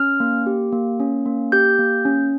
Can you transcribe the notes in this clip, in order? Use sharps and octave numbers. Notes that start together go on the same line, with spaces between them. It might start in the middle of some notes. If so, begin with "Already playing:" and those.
Already playing: C#4 F6
A#3
G4
A#3
C#4
A#3
G4 G6
A#3
C#4